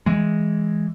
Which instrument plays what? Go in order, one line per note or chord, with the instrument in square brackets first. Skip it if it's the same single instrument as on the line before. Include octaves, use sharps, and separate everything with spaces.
[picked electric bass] E3 G#3